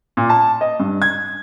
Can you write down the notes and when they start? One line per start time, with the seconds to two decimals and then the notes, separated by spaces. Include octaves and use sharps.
0.17 A#2
0.30 A5
0.61 D#5
0.80 G2
1.02 G#6